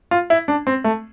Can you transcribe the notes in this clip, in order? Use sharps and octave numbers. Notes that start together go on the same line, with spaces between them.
F4
E4
D4
C4
A3